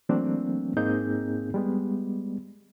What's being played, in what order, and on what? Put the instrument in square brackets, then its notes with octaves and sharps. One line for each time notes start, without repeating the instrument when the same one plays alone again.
[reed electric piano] E3 F#3 A3 A#3 C4 D4
G#2 A#3 C4 D#4 G#4 G6
G3 G#3 B3